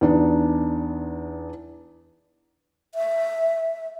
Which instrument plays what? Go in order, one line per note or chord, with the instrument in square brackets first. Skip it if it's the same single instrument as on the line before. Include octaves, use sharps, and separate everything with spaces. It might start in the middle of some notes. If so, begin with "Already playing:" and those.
[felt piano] E2 D4 D#4
[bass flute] E5